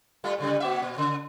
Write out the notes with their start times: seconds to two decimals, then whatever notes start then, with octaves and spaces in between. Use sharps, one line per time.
0.24 G3 A3 F4
0.38 A2 C#3 G3
0.60 A#3 F#4 E5
0.82 A#2
0.98 C#3